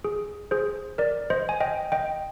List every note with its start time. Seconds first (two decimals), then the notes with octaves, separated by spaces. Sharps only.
0.04 G#4
0.51 G#4 C5
0.98 A#4 D5
1.30 C5 D#5
1.49 G#5
1.60 D#5 G5
1.92 D#5 G5